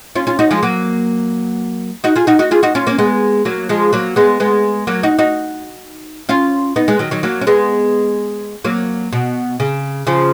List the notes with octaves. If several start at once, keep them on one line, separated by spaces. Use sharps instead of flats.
C#4 F4
C#4 F4
D#4 F#4
F3 G#3
F#3 A#3
D#4 F#4
F4 G#4
D#4 F#4
D#4 F#4
F4 G#4
D#4 F#4
C#4 F4
A#3 C#4
G#3 B3
F#3 A#3
F3 G#3
F#3 A#3
G#3 B3
G#3 B3
F#3 A#3
D#4 F#4
D#4 F#4
C#4 F4
B3 D#4
G#3 B3
D#3 F#3
D#3 F#3
F#3 A#3
C#4
G#3 B3
F#3 A#3
B2
C#3
C#3 F3